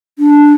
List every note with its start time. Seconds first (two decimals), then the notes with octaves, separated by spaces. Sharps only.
0.19 D4